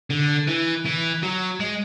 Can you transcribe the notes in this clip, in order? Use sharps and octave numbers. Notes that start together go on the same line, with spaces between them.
D3
E3
E3
F#3
G#3